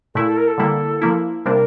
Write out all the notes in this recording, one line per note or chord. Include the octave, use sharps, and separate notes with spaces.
A#2 A3 E4 A4
A4
A#4
A4
D3 G3 A#3 E4
F3 A#3 E4
C3 G3 A#3 D4 A#4